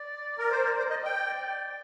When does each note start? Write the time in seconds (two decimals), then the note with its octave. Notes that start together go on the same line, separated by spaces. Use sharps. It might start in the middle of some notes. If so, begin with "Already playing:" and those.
Already playing: D5
0.39 A#4
0.51 C5
0.64 A#4
0.78 C5 D5
0.90 D#5
1.04 G5